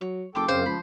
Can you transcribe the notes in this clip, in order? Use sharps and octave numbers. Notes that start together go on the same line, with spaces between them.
F#3 C#5
F#1 G4 A4 G5 C6 D6
F#2 C#3 C4 C5 F5
C#2 F3 B5